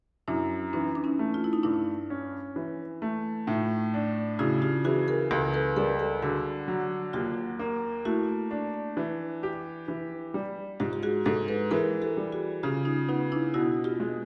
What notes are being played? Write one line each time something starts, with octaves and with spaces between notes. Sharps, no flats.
F#2 D4 E4
E3 C#4 D#4
D4
C#4 D#4
A3
F4
E4
D#4
G2 D4 E4
C#4
E3
A3
A2 D#4 F4
D4
C#3 E4 F#4
F4 G4
E3 F#4 G#4
G#4 A#4
C#2 G4 A4
A4 B4
G3 G#4 A#4
G4 A4
D3 F#4 G#4
F#3
D#2 F4 G4
A#3
A3 E4 F#4
D4
E3
G4
E3
G3
G#2 F4 G4
G4
F#4 G#4
G#2 G4 A4
A4 B4
E3 G#4 A#4
G4 A4
G3
F#4 G#4
C#3 F4 G4
D#4 F4
B3 D#4 F4
D4 E4
B2 E4 F#4
F4 G4
G#3